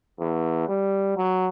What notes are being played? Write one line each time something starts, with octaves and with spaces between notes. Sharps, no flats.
E2
G3
F#3